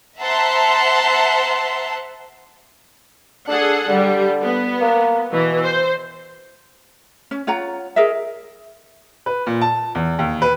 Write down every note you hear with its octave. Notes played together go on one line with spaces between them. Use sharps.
C5 E5 F#5 A5 A#5 C6
D4 G#4 A4 F#5
D3 G3
B3
A#3
B2 E3
C5
C#4
F4 C#5 F#5 A#5
G#4 A#4 D#5 E5
B4
A#2
A5
E2
D#2
B4